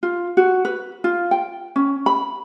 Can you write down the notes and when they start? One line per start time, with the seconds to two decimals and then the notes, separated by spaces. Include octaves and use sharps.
0.03 F4
0.37 F#4
0.65 B4
1.04 F4
1.31 G5
1.76 C#4
2.06 B5